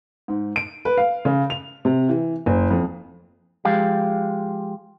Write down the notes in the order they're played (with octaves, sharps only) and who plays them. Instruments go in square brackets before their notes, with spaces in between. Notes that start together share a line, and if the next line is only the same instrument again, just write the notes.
[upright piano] G#2
D7
B4
F5
C#3
F7
C3
E3
F#1
F2
[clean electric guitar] F3 G#3 G4 F5